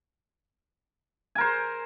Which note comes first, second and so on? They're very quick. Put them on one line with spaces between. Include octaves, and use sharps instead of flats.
G#5 A#4 C5